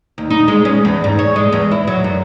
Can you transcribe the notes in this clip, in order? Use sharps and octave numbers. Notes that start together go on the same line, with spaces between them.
D#2
D#4
G#3
C#4
E2
G#2
C#5
G#3
E2
E4
F#3
F#2